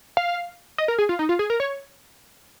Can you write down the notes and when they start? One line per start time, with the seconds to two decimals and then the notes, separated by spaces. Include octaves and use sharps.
0.17 F5
0.78 D#5
0.88 A#4
0.98 G#4
1.09 F4
1.19 D#4
1.29 F4
1.39 G#4
1.50 A#4
1.60 C#5